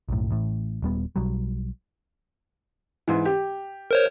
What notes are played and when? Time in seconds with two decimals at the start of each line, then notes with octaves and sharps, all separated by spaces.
0.09 B1 F#2 A2
0.31 A1 A2
0.82 D#1 G3 B3
1.16 B1 F#3 G3
3.08 G#2 E3
3.26 G4
3.91 A#4 C5 C#5